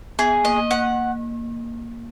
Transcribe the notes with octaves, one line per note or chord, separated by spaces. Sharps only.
B3 G#4
A#3 D#5
A#3 F#5